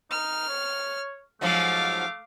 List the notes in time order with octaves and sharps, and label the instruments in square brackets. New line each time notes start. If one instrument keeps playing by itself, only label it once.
[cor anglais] D#4 [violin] F6
[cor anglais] C#5
[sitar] G#2 F3 F#3 [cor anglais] A3 [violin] F5 D6